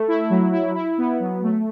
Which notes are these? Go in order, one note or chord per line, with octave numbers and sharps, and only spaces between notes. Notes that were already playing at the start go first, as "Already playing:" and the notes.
Already playing: A3
E4
F#3
E4
E4
B3
F#3
A3